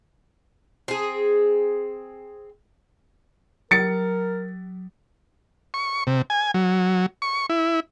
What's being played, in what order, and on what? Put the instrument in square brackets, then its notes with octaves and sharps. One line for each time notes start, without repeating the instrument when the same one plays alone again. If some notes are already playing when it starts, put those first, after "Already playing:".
[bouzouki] C4 G#4
[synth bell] F#3 [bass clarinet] A#4 [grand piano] A6 C#7
[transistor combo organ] C#6
C3
G#5
F#3
C#6
E4